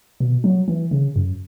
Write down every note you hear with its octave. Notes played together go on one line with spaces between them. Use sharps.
B2
F#3
E3
C#3
F#2